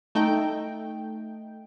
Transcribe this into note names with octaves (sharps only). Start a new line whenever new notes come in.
A3 D#4 G5